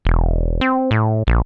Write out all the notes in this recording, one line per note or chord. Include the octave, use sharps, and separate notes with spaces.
E1
C4
A2
A#1